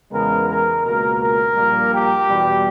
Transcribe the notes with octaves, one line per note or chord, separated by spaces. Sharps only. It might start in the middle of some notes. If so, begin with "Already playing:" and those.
E2 C#3 G#3 B3 A#4
A#4
C#2 B2 A#3 A#4
A#4
A#1 A#2 G3 A#3
G4
E2 B2 G3